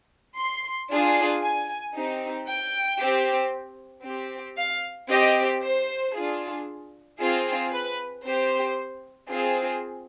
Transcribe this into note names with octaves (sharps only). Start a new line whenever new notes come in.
C6
D4 F4 G#4
G#5
C4 D#4 G4
G5
C4 G4
C4 G4
F5
C4 G4 D#5
C5
D4 F4 G#4
C4 F4 G#4
B4
C4 G4 C5
C4 F4 G#4